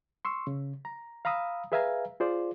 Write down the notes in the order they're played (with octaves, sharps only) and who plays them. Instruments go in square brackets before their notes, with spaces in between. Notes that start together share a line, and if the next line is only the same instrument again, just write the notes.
[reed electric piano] C6 C#6 E6
C#3
A#5
F5 A#5 B5 D#6 E6
G#4 B4 E5 F5 G#5 A#5
F4 G#4 C5 D5